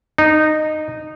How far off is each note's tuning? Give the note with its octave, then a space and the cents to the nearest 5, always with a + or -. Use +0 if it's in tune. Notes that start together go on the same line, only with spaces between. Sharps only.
D#4 -15